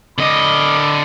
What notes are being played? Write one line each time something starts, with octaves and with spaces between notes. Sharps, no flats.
D3 D#5 B5 D6